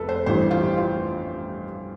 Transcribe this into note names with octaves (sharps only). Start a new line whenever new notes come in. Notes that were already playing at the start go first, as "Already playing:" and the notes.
Already playing: F1 F2 A4 B4
C5
A1 G2 E3 C5
F4
G4
F4